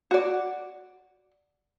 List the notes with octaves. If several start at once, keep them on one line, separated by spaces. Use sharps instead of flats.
F#4 D5